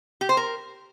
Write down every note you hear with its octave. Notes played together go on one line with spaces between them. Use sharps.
G4
C5
A#4